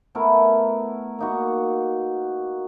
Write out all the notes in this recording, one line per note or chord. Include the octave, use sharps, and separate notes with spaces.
A3 B3 E4 A#4
A#3 D#4 F#4